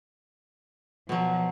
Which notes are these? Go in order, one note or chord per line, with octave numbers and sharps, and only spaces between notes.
B2 F3 F#3